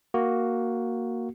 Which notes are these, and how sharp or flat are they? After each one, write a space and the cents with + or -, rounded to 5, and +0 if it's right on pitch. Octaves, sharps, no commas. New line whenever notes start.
A#3 +0 F#4 +0